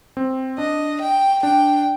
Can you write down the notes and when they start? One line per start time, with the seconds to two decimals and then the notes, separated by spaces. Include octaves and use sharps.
0.17 C4
0.58 D4 D#5
1.01 G5
1.43 D4 G5